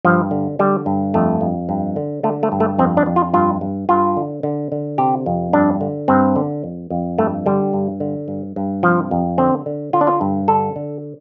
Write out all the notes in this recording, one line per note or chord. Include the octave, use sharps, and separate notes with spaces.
G2 F3
D3
D3 G3
G2
F2 A3
F2
G2
D3
D3 A3
A3
G2
A3
F2 C4
D4
F2
F4
G2 F4
G2
G2 F4
D3
D3
D3
C3 G4
F2
G2 D4
D3
G2 C4
D3
F2
F2
G2 A3
D3 G3
G2
D3
G2
G2
C3 F3
F2
D3 C4
D3
D3 F4
D4
F4
G2
D3 A4
D3